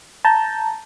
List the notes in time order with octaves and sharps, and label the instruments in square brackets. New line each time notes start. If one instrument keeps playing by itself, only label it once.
[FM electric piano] A5 A#5 G6